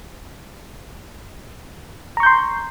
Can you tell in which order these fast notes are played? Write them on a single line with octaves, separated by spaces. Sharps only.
A#5 C#6 G6 C6